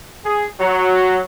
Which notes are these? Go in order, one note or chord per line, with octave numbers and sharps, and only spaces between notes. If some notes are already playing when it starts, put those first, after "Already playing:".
G#4
F#3